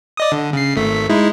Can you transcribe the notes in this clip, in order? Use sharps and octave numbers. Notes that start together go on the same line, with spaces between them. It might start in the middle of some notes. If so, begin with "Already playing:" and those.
D5 D#5 D#6
D3
C#3 C7
G#1 A3 B6
G#3 D#4 E4